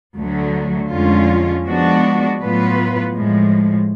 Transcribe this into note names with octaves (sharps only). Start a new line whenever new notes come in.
D2 D3 F#3 A3
F2 D3 G#3 C#4 F4
F3 G#3 B3 D4 F#4
A2 F#3 B3 F4 B4
A2 F3 G#3